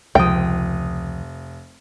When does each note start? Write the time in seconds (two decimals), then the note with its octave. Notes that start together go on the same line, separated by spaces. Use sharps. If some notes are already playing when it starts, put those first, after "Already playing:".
0.15 F1 C#2 F3 G5 D#6